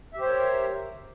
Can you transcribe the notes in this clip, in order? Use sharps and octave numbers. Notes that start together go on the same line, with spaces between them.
G4 A#4 C5 C#5 E5